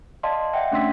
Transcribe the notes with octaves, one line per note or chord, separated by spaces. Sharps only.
D5 D#5 F5 A5 C6
D5 E5 F#5 G5
A3 C#4 D4 C6 E6 B6